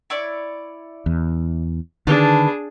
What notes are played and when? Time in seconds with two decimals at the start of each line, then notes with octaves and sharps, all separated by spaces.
0.10 E4 C#5 D5
1.06 E2
2.07 D3 D#3 D4 G#4 B4 F5 A5